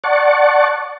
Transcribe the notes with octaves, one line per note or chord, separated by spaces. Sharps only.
D5 F#5 A5 C#6